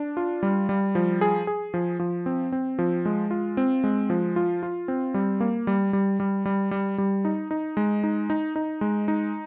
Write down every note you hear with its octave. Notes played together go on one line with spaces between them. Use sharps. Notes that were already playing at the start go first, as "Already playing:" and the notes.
Already playing: D4
F4
G3
G3
F3
G#4
G#4
F3
F3
C4
C4
F3
G#3
F4
C4
G#3
F3
F4
F4
C4
G3
A#3
G3
G3
G3
G3
G3
G3
D#4
D#4
G#3
D#4
D#4
D#4
G#3
D#4